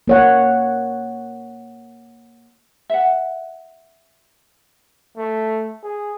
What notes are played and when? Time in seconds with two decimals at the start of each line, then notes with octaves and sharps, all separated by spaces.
0.08 A#3 C#5 F#5
2.90 E5 F#5
5.17 A3
5.83 G#4